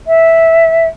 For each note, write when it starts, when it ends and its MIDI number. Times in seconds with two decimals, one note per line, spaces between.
0.07 0.88 76